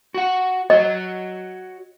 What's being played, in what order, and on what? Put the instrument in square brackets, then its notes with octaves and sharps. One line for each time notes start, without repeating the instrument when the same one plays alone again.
[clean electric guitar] F#4 F#5
[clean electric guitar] F#4 C#5 [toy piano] D#5